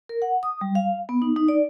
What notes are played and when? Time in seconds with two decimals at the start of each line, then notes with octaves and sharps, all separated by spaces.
0.09 A#4
0.22 F#5
0.43 D#6
0.61 G3
0.75 F5
1.09 B3
1.22 D#4
1.36 D#4
1.48 D5